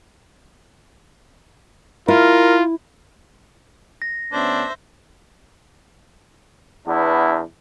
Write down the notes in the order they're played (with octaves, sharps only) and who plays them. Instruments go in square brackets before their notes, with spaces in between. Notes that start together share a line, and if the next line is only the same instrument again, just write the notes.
[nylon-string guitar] E4 [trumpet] F4 [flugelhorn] A#4
[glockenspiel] A#6
[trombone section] D2 B3 C#4 [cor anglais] D4 [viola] C5 E5
[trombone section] E2 B3 D4 E4